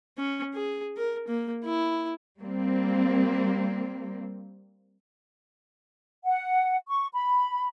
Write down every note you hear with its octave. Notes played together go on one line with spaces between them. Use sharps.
C#4
G#4
A#4
A#3
E4
G3 A#3 C4
F#5
C#6
B5